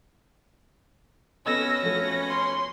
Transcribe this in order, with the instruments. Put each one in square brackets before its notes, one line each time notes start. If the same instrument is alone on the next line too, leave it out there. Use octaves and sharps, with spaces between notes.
[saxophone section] F#2 B2 C#4 [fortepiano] B3 A4 D#5 [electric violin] E6 A#6
[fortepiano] F2 F#3 A3 [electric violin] A#6
[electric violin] C6